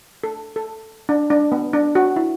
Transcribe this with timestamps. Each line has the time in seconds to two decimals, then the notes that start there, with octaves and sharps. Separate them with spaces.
0.24 A4
0.56 A4
1.09 D4
1.30 D4
1.52 B3
1.73 D4
1.95 F#4
2.16 E4